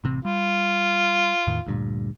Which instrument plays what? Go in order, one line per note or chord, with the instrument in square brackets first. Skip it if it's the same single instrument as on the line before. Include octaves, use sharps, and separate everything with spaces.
[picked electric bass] A1 C3 C4
[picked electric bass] G3 [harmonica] F4
[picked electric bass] E2 A2 D#3
D2 G2 A#2